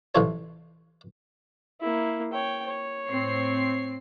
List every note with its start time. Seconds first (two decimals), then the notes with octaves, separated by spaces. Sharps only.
0.15 A1 C3 E3 F4 A4 C#5
1.81 A#3 E4
2.33 C#5 G5
2.66 C#5
3.09 A2 C4 C7